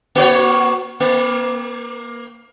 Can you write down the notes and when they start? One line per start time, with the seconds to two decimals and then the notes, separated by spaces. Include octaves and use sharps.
0.15 A#3 F#4 C#5
1.00 A#3